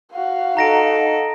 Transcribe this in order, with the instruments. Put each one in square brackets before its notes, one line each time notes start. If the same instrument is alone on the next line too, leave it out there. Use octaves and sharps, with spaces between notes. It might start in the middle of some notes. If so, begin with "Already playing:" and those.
[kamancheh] F#4 F5
[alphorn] D#4 [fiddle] A4 [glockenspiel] A#5 A#6 D7